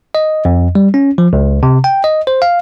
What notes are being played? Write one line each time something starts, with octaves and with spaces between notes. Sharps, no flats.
D#5
F2
G3
C#4
F3
C#2
C3
G5
D#5
C5
F5